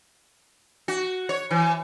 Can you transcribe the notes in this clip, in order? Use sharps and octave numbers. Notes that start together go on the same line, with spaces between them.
F#4
C#5
E3